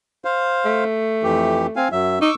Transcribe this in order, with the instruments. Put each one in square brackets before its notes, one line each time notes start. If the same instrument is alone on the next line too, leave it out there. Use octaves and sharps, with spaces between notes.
[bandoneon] C5 F5
[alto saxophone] A3
[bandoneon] F2 E3 G4
C4 F5 G#5
F#2 F#3 E5
[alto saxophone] D#4 [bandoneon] C#6 D6 E6